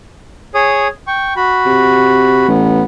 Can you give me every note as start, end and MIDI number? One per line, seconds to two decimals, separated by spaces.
0.54 0.88 68
0.54 0.88 73
0.54 0.88 87
1.07 1.34 79
1.07 1.34 85
1.36 2.47 66
1.36 2.47 83
1.66 2.45 48
2.48 2.84 33
2.48 2.83 59